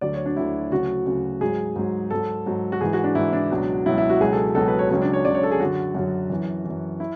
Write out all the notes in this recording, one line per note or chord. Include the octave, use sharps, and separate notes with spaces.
D2 D3 F#3 D5
C#5
D4
D2 D3 F#3 E4
D2 C#3 F#3 F#4
D2 C#3 F#3
G#2 F#3 G#4
G#2 F#3
G#2 F#3 A4
G#2 F#3
F#4
G#2 E3 G#4
F#4
D4
G#2 E3 E4
D4
C#2 B2 F#3
C#2 B2 F#3 E4
E4
F#4
C#2 B2 F#3 G#4
A4
C#2 B2 F#3 A4
B4
C#5
C#2 C#3 F#3 C#5
D4
C#5
C#2 C#3 F#3 D5
C#5
A4
G#4
F#2 D3 F#3 F#4
F#2 D3 F#3
F#2 E3
E3
F#2
E4